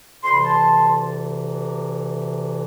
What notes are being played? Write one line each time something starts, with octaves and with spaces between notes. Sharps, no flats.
D2 C3 E3 C6
B5
A5 C6